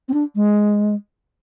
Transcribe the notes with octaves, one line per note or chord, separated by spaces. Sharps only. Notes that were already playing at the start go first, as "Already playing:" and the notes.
C4
D4
G#3